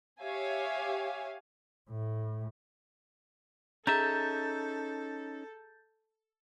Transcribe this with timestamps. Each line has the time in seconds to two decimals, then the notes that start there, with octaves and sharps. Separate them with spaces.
0.22 G4 C#5 E5 F5 G#5
1.89 A2
3.87 C#4 D#4 G#4 A4 E5 A#5 G6 A6